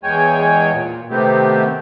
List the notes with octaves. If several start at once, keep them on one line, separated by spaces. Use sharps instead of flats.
E2 G#3 C#5 G5 G#5
A#2
C3 D#3 A3 B3 C4 G4